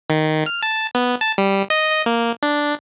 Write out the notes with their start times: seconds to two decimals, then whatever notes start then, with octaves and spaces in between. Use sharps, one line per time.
0.10 D#3
0.46 F6
0.62 A5
0.95 B3
1.21 A5
1.38 G3
1.70 D#5
1.91 D#5
2.06 A#3
2.43 D4